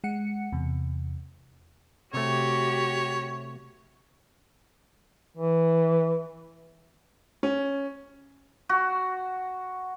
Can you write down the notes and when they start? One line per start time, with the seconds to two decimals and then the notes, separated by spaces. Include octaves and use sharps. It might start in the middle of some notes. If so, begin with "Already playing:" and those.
0.04 G#3 F#5 C#7
0.52 E2 C3
2.14 C3 A3 F#4 G4 C#5
5.37 E3
7.43 C#4
8.69 F#4